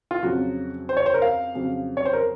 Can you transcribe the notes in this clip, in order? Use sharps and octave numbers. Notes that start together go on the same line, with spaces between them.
F4
F2 C#3 F#3 F#4
C5
C#5
C5
A#4
F5
F2 C#3 F#3
C#5
C5
A#4